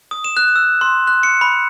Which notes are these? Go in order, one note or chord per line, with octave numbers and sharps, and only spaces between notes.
D#6
E7
F#6
E6
C6
F#6
C#7
B5